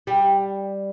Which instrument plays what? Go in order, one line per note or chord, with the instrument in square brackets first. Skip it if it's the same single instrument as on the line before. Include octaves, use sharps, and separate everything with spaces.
[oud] G3